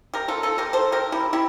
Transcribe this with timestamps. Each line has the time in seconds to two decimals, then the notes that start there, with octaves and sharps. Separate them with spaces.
0.14 G4 A#4
0.28 F4 A4
0.43 F4 A4
0.58 G4 A#4
0.73 A4 C5
0.92 G4 A#4
1.12 E4 G4
1.33 E4 G4